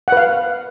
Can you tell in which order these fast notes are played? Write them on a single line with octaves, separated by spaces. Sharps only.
F#5 B4 F5